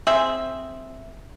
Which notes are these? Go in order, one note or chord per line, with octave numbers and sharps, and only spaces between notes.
C4 G#4 C5 E5